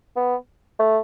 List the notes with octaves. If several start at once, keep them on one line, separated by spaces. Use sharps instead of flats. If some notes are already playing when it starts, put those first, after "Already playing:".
B3
A3